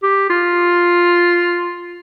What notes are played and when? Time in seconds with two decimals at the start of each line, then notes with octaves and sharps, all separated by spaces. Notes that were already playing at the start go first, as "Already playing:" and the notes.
0.03 G4
0.30 F4